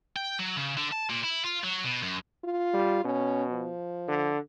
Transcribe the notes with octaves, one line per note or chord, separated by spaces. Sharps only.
G5
F#3
C#3
D3
A5
A#2
E4
F4
F#3
B2
F#2
F4
G3
B2 C#4
F3
D3